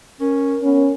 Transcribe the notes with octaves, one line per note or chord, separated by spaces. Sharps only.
C#4 A#4
B3 C#4